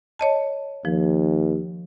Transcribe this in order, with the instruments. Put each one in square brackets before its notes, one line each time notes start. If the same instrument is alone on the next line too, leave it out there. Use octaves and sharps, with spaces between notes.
[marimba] C#5 D#5 A5
[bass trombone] D#2 [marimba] F3